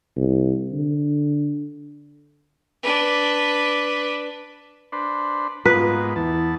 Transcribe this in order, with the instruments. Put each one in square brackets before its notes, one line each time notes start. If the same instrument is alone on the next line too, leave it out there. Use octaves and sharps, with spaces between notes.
[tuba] C2
D3
[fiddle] D4 B4
[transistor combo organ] D4 B4 C5
[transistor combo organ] G#2 A#3 B3 [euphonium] F4 [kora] B4
[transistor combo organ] E2 B3 A5 [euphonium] E3